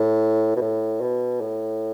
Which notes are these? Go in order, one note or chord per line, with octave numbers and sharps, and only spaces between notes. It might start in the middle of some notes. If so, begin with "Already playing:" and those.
Already playing: A2
B2
A2
B2
A2